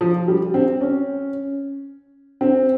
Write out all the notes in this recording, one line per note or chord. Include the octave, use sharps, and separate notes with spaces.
F3
G3
C4
C#4
C4